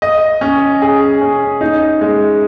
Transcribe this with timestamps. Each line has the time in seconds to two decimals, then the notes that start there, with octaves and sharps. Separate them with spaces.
0.02 D#5
0.41 C#4
0.82 G#4
1.21 C#4
1.61 D#4
2.01 G#3